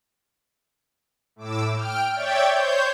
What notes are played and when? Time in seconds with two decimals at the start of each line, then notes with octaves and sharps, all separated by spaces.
1.36 A2 D6 E6
1.74 G5 F6 D7
2.13 C#5 D5 E5 G5 G6 A6
2.51 C5 C#5 G6